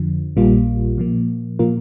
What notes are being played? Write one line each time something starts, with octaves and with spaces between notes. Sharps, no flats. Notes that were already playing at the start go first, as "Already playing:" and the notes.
Already playing: F2 D3 F3
A#1 A#2 G3 A#3 F4
A#2 F3 A#3
A#2 F3 A#3 F4 A#4